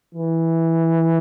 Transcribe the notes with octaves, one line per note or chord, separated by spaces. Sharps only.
E3